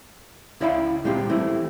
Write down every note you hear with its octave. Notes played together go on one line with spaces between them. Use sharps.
C#2 E4 D5 E5 F5 B5
A#2 G3 G#3 C4 F4 G4
E3 A3 C4 E4